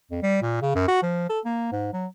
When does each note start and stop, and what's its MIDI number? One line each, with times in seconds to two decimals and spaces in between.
0.11 0.21 41
0.23 0.40 55
0.42 0.58 46
0.62 0.74 49
0.75 0.84 42
0.88 0.99 66
1.02 1.27 53
1.29 1.40 69
1.45 1.72 58
1.72 1.90 44
1.93 2.06 54